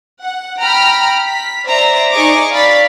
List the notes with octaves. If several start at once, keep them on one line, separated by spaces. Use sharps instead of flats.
F#5
G5 A#5 B5 F6
B6
C5 D5 E5 A#5
D#4 G#4 D5 D#5 C#6 D6
D5 F5 B5 A6 B6